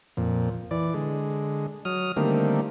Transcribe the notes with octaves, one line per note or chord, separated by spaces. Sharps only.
F2 A#2
E3 D5
D3 G#3
F#3 D#6 F6
D3 D#3 G3 A3 A#3 C4